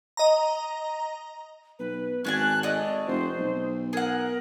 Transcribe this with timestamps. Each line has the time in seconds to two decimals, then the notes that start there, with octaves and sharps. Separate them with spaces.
0.17 D#5 A#5
1.79 B1 B4
2.25 G#1 C#4 D4 G#5 F#6
2.63 A3 D5 D#5
3.07 F1 C5
3.39 B1
3.93 G#4 A#4 F#5